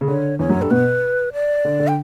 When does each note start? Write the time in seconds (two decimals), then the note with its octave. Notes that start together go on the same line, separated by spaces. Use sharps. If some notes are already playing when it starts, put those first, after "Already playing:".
0.01 C#3
0.08 D3 C#5
0.39 E2 E3 C#5
0.49 F#2 F#3
0.60 G2 G3 A4
0.71 B2 B3 B4
1.33 D5
1.65 D3
1.80 D3
1.88 G5